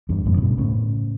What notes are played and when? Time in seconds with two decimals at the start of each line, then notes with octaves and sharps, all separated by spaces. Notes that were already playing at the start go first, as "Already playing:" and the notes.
0.09 E2 G2
0.26 F#2 A2
0.37 C#3
0.42 G2 B2
0.58 A2 C#3